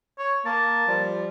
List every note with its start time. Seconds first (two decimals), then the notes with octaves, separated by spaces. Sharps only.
0.18 C#5
0.46 A#3 A5
0.88 F3 G3